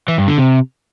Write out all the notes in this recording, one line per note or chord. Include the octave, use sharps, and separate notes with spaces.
E3
G2
D3
C3